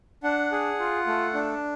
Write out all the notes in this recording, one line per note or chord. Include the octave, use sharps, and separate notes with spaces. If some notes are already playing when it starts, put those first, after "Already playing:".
D4 F#5
G#4
F4
A3
D4